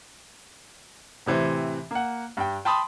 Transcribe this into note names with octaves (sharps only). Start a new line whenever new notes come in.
A2 C3 E3 C4
A#3 F#5
G2 G5
G5 A5 B5 C6 D#6